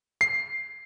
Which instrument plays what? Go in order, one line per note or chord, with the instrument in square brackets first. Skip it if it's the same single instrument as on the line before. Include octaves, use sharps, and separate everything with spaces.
[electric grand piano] C7